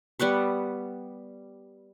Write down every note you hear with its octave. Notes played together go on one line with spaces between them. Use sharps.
G3 B3 F#5 C#6